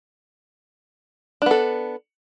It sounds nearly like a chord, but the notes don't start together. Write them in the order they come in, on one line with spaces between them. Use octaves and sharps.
D4 B3 A4